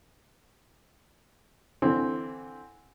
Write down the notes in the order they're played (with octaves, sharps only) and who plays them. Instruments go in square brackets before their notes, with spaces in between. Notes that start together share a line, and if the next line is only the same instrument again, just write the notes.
[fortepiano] D3 E3 C4